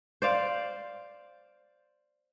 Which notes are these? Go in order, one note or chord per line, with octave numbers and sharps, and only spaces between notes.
C5 D5 F5